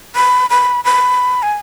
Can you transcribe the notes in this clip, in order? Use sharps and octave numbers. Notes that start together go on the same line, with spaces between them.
B5
B5
B5
G#5